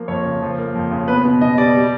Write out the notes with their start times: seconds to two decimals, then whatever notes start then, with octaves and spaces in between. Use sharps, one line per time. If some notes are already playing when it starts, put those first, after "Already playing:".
Already playing: F3 A#3
0.08 F2 C#5
0.25 C#3
0.42 F3
0.58 A#3
0.75 F2
0.92 C#3
1.08 B3 B4
1.24 B2
1.41 B2 D#5
1.58 G3 D5
1.75 G3